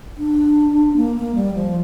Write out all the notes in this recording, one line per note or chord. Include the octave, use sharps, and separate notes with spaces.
D4
A#3
A#3
G3
F3